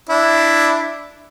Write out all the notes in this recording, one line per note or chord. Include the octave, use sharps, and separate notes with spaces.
D4 E4